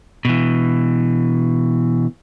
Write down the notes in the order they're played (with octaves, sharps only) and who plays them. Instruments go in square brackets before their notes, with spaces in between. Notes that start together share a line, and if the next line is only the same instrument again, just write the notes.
[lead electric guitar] B2 E3